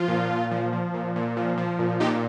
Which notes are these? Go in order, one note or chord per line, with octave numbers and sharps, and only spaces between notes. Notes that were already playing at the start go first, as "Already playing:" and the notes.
Already playing: F3 F4
A#2
A#2
F3
F3
A#2
A#2
F3
F3
A#2
A#2 D#4 G4